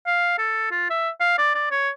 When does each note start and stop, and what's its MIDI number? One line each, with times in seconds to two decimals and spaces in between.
0.06 0.38 77
0.38 0.69 69
0.71 0.86 65
0.90 1.10 76
1.20 1.35 77
1.38 1.52 74
1.55 1.70 74
1.71 1.90 73